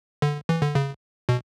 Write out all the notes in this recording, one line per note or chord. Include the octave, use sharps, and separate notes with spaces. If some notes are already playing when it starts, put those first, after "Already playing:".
D3
E3
D3
C#3
B2